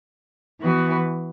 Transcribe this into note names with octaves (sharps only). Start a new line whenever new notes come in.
E3 B3 F#4 B4